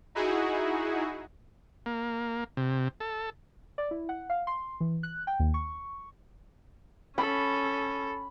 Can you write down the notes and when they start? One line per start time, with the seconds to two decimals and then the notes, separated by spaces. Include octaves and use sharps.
0.15 D#4 E4 F#4 G#4
1.86 A#3
2.57 C3
3.00 A4
3.78 D5
3.91 E4
4.09 F#5
4.30 F5
4.47 C6
4.81 E3
5.03 F#6
5.27 G5
5.39 D#2
5.54 C#6
7.18 C#4 A4 B5